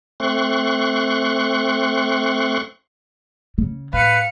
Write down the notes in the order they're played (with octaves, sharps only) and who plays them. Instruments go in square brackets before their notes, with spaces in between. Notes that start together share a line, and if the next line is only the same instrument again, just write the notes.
[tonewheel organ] A3 C4 C6 C#6 F#6
[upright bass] C#3
[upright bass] A2 [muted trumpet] B4 [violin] F5 C#7